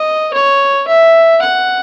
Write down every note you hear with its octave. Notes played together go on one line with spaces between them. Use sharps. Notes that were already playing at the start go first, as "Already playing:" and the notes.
Already playing: D#5
C#5
E5
F#5